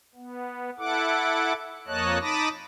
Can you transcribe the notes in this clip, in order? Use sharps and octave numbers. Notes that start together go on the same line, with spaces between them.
B3
E4 A4 F#5 D6
F2 A#3 C#5 D#5 A5 F#6
D#4 A5 B5 D6 D#6 A#6